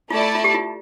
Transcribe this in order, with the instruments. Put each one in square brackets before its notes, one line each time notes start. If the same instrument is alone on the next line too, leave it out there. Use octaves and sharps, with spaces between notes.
[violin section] A3 E4 A4 D5 A5 [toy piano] F4
[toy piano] F4
G4
F4